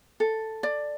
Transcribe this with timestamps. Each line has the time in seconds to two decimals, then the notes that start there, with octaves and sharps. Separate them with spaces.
0.20 A4
0.63 D5